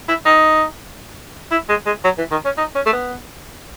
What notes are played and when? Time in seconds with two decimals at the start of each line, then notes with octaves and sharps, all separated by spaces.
0.09 E4
0.26 D#4
1.51 E4
1.69 G#3
1.86 G#3
2.04 F#3
2.18 E3
2.31 D#3
2.45 C#4
2.58 D#4
2.75 C#4
2.86 A3
2.93 B3